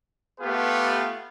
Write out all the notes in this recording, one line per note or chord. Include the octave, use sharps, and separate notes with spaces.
A3 B3 F4 G4 B4